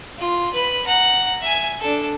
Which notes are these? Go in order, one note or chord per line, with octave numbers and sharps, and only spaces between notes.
F4
B4 B5
F#5 A#5
E5 G#5
D4 A4